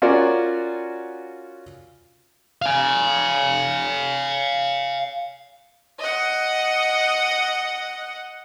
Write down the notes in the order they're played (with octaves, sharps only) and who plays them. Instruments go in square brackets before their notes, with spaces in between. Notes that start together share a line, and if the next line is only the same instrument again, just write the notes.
[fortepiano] C#4 F4 F#4 A#4 D5
[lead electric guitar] F5 G#5
[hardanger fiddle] D#5 F#5